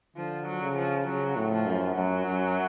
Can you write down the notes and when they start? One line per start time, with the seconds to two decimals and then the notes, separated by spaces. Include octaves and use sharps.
0.16 D3 F3
0.47 F#3
0.61 C#3
0.77 F3
1.06 C#3 F#3
1.36 A2
1.52 F3
1.66 F#2
1.96 F#2 F#3
2.26 F#2